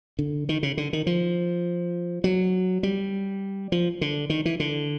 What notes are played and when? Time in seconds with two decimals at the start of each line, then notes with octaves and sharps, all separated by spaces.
0.19 D3
0.49 D#3
0.63 C#3
0.77 D3
0.93 D#3
1.07 F3
2.24 F#3
2.83 G3
3.72 F3
4.01 D3
4.30 D#3
4.45 E3
4.60 D3